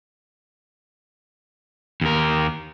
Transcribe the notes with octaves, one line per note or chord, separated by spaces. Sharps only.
D#2 A#4